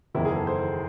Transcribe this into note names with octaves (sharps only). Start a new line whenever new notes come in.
F#1 E2 D#3 E4
G#4
A4
C5